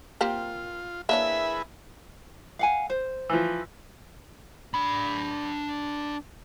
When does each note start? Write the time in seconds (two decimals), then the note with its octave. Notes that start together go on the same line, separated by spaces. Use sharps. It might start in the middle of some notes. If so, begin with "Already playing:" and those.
0.21 A#3 C4 F4 G4
1.09 A#3 D4 E4 G#4 B4 C#5 E5
2.59 F5 F#5 G#5
2.90 C5
3.30 E3 F3
4.74 D4 B5